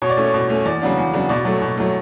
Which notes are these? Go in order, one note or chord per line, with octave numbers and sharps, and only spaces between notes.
B2 C#5
D5
A3 C#4 C#5
B2
A3 C#4
E2 D5
C#3 F#3 B3 D4
E2
C#3 F#3 B3 D4
B2 D5
F#3 A3
B2
F#3 A3